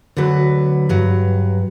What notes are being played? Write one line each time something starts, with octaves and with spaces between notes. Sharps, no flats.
D2 D3 F#3 B4
G2 F#3